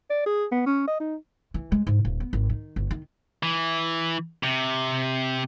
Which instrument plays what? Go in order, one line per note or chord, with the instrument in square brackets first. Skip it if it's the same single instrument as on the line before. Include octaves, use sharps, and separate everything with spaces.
[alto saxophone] D5
G#4
B3
C#4
D#5
D#4
[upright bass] E3
G#3
G#2
D#1
B3
G#1
D#3
G1
D#3
[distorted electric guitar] E3
C3